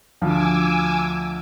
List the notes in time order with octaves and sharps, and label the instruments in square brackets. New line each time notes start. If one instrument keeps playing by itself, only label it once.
[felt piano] D2 F3 [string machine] G#5 D6 E6